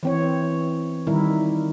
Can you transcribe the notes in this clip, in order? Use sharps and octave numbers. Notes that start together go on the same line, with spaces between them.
E3 C4 C#5
D#3 G3 E4 A#4